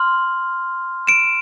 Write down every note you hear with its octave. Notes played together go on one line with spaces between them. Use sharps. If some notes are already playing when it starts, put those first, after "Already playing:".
Already playing: C6 F6
D7 E7